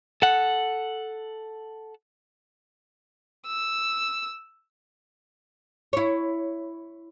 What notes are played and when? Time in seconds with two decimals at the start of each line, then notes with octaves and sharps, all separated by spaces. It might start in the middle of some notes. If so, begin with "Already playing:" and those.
0.22 A4 F#5
3.47 E6
5.93 E4 C#5